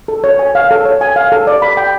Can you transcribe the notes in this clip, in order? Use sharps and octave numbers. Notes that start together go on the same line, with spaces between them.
A4
C#5
G#5
F5
A4
C#5
G#5
F5
A4
D5
B5
G5